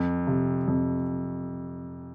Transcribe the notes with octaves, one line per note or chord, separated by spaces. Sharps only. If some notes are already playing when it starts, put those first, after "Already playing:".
Already playing: F2
C3
F2